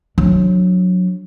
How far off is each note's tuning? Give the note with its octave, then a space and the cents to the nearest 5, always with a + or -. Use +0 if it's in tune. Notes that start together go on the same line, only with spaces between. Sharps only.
F#3 -20 D4 +0